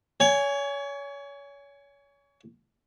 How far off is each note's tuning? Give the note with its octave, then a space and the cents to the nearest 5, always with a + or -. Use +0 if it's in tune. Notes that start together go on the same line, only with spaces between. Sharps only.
C#5 +30 G#5 +0